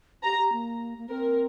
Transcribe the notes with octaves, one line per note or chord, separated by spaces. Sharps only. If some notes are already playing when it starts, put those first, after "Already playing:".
G4 A#5
G4
A#3
A#3
C4 A#4